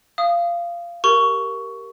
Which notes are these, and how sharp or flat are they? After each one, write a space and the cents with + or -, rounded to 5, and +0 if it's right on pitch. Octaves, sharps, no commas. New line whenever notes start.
F5 -20 D#6 -10
G4 +0 A#4 +0 C#6 +15